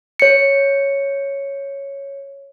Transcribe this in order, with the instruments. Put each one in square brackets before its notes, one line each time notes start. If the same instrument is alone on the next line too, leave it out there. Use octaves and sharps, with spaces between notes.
[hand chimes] C#5 C#7